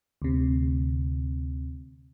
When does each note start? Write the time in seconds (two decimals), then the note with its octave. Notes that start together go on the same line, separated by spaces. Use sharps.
0.22 D2 C3